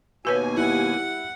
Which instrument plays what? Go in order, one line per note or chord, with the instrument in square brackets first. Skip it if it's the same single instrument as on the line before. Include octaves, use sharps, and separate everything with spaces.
[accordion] D#2 B2 G#5 [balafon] F#4 B4 C#5
[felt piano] G3 E4 [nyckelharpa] F#5